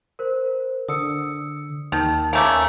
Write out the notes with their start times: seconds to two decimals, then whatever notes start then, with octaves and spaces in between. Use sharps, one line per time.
0.19 A#4 C5
0.89 D3 D#6 E6 C#7
1.92 D#2 D#3 A5
2.33 C#3 A3 A#3 G#5 A#5 D6